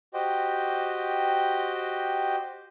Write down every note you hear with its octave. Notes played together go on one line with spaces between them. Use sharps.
F#4 G4 C5 D#5 G5